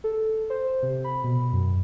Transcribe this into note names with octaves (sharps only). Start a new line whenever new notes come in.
A4
C5
C3
B5
B2
F#2